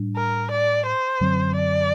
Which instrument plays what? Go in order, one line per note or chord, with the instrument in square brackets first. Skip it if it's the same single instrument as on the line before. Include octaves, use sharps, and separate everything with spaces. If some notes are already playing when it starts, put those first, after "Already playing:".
Already playing: [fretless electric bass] A2 G3 D4
[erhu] A#4
D5
C5
[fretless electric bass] F#2 D3 F#3 C4
[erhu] D5